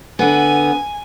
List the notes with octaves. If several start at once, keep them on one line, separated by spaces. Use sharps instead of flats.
D3 B3 G#5